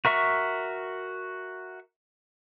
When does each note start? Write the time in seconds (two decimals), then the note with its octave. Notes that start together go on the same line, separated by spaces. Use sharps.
0.05 F#4 A#4 E5 C#6